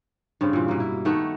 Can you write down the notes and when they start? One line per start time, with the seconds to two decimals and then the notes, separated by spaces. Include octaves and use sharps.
0.41 G2 C#3 C4
0.53 A#2 E3
0.68 B2 A#3
0.80 E4
1.05 D#3 A3 B3 F#4